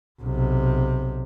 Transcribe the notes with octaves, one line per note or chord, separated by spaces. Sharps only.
B1 C3